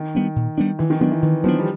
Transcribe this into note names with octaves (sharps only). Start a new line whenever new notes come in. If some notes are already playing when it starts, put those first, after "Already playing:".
Already playing: D#3
G3 B3 D4
A#2
G3 B3 D4
D#3 E3
D#3
D#3 F#3 B3 D4
E3
D#3 E3
F3 F#3 B3 D4
G3